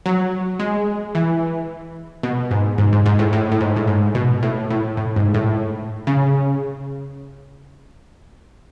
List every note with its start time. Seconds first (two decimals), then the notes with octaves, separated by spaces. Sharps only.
0.06 F#3
0.59 G#3
1.15 E3
2.23 B2
2.51 G#2
2.78 G#2
2.93 G#2
3.06 G#2
3.19 A2
3.33 A2
3.52 A2
3.61 G#2
3.76 A2
3.87 G#2
4.15 B2
4.43 A2
4.70 A2
4.97 A2
5.16 G#2
5.34 A2
6.07 C#3